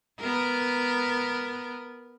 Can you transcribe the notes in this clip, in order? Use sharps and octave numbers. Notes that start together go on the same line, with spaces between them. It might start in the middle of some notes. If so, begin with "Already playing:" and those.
B3 A#4